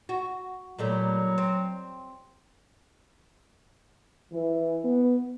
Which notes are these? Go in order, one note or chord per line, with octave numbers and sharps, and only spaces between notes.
F#4
A#2 F#3 G3 A3
C4
E3
B3